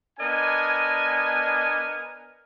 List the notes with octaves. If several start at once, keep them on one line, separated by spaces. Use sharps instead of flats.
B3 D4 A#4 D#5 G#5